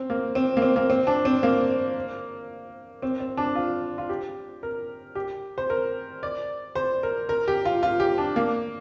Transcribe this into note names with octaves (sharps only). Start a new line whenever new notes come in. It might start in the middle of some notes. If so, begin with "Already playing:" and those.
Already playing: C4
A#3
C4
A#3
C4
A#3
C4
D4
C4
A#3
C4
C4
D4
F4
F4
G4
A#4
G4
C5
A#4
D5
C5
A#4
A#4
G4
F4
F4
G4
D4
A#3